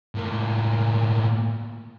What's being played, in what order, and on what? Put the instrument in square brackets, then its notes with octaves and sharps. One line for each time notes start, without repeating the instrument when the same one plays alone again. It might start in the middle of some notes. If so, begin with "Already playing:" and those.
[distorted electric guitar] A2 A#3